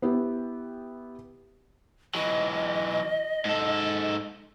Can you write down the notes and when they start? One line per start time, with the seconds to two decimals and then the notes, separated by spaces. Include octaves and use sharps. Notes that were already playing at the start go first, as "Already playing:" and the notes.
0.02 B3 E4 G4
2.15 E3 F#3 D#5
3.45 G#2 A4